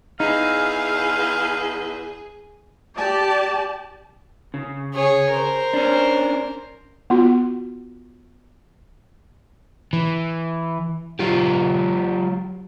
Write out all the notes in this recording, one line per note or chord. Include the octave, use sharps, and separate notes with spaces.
E2 D#4 G#4 F5
G4 D5 A5
C#3
G#4 C#5
A#4 C5
C#4 D4
B3 F4 F#4
E3
F#3 F4 G4